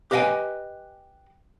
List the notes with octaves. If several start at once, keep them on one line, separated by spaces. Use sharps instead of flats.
G4 B4 D#5 F5 G5 G#5